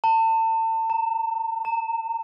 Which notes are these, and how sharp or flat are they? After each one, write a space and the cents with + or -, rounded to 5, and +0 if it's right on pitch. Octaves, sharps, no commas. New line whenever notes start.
A5 +35
A#5 -20
A#5 -30